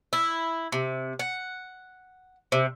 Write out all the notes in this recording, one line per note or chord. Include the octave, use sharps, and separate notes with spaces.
E4
C3
F#5
C3